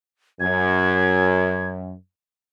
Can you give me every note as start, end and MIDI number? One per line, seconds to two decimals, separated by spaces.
0.40 1.93 42
0.40 1.68 92